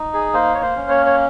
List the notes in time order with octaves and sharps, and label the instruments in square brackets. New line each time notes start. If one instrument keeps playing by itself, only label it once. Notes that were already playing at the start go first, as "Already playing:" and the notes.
Already playing: [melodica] D#4
G#4
A#3 C5
C#5
C5
C#4
C#5
C#5